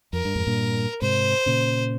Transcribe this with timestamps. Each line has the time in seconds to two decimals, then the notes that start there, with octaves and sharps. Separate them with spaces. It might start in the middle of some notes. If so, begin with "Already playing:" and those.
0.13 F2 A#4
0.25 G2
0.36 F2 G#2
0.47 G2 A#2
1.02 G#2 C3 C5
1.46 A#2 C#3